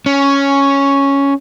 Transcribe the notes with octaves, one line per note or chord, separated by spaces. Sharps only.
C#4